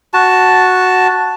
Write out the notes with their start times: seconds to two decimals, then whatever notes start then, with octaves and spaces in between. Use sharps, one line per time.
0.14 F#4 A5